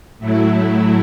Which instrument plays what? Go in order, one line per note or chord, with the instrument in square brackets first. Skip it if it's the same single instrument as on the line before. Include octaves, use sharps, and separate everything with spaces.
[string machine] A2 F#3 A3 E4